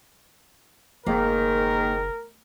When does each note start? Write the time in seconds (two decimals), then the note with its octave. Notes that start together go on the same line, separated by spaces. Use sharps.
1.06 F#1 G#2 D#3 A#3 A#4